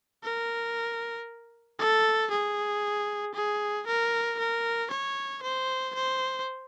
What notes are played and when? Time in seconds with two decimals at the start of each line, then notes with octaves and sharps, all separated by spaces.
0.24 A#4
1.79 A4
2.31 G#4
3.34 G#4
3.87 A#4
4.39 A#4
4.91 C#5
5.43 C5
5.95 C5